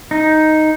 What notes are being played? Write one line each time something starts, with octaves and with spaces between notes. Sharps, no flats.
D#4